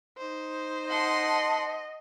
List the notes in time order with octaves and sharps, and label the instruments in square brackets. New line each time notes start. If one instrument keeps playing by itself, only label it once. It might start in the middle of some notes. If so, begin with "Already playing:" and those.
[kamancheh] D#4 C5
[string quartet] D#5 [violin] F#5 C6 [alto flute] A5